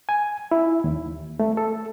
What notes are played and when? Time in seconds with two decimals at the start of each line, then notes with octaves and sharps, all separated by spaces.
0.09 G#5
0.51 E4
0.84 D#2
1.40 A3
1.57 A4